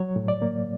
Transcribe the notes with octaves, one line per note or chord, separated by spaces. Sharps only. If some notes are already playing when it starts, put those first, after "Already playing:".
Already playing: F#3 C#5
A2
D5
A#3